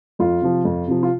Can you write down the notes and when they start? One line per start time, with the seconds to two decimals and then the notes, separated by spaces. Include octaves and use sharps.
0.19 F2 F4
0.42 C3 F3
0.65 F2
0.88 C3 F3
1.03 F4